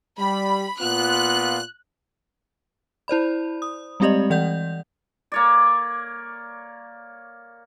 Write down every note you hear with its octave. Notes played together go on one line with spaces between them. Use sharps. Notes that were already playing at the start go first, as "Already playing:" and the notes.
G3 B5
A#2 B3 F4 F#6
E4 C5 D5 B5
D#6
G3 G#3 C4 G4 D5 D#5
E3 D5 F#5 G6
A#3 C#5 D5